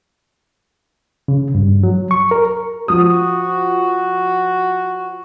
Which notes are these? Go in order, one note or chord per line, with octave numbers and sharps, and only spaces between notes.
C#3
G2
F#3
C#6
A#4
F3 F#4 D#6